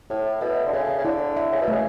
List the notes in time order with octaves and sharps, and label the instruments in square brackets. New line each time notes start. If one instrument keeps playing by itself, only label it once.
[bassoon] A2 [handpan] A4
[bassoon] B2 [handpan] E5
[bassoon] D3
[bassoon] C#3 [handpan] A4
[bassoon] C#3
[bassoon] D3 [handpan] E4
[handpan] E5
[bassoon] C#3
B2
[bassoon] C#3 [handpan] A3